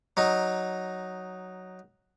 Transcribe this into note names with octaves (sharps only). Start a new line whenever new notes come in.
F#3 D#4